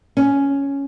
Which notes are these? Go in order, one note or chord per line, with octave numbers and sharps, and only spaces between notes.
C#4